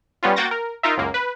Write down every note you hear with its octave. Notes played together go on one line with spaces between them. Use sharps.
G3 B3 C#4 F4
A#3 F#4 G5 G6 A6 A#6
A#4
D#4 F4 A#4 E5
C#2 F#2 A#3
B4